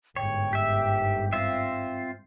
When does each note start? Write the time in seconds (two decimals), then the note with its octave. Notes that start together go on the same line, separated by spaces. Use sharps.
0.16 G1 G#2 C#5 G5
0.53 G4 E5
1.33 C4 F4 E5